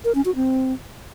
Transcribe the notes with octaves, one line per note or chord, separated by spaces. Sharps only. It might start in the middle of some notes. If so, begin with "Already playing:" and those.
A#4
C#4
F#4
C4